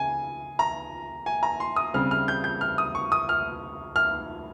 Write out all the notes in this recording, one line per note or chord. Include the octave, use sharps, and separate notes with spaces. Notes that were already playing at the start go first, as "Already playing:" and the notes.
Already playing: C#3 G#5
A#5
G#5
A#5
C6
D#6
C#3 G3 C4 F6
F6
G6
G6
F6
D#6
C#6
D#6
F6
F6